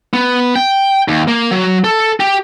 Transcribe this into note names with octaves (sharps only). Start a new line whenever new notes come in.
B3
G5
D#2
A#3
F#3
A4
G4